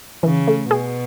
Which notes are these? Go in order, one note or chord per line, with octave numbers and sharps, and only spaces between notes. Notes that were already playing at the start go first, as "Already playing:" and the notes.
C#3 E3
A3
B2 G#4